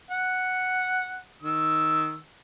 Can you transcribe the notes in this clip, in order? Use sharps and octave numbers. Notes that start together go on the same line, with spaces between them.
F#5
D#3 E6